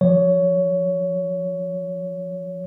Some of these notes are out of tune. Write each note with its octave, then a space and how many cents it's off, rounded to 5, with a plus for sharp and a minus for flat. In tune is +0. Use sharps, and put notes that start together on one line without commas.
F3 +0 C#5 +15